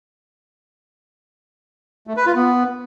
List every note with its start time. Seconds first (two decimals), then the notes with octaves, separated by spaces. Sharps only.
2.07 A3
2.17 B4
2.26 F4
2.36 B3